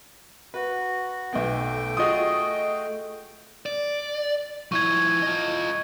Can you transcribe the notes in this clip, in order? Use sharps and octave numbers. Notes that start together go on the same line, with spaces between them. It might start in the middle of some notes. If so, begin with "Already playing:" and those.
F#4 B4
B1 A3 B3 G5
F4 F#4 G#4 D#5 D#6
D5
F3 E4 C#6 G#6
F4 D#5